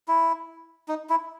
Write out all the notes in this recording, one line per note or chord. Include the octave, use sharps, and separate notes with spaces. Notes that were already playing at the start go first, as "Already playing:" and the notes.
E4
D#4
E4